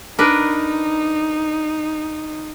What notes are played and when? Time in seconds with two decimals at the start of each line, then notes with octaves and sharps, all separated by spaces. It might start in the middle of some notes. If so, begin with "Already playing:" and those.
0.19 D4 D#4 A#4 B4